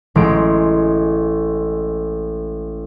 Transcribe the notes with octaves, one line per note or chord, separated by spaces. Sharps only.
A1 G#3 D7